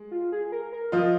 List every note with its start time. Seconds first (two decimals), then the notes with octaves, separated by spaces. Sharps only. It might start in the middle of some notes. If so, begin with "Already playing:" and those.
Already playing: G#3
0.11 F4
0.32 G#4
0.52 A#4
0.73 A#4
0.92 F3 F4 D#5